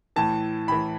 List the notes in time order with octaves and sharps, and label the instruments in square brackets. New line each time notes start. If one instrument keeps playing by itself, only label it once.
[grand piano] A2 E3 A5
A2 E3 B5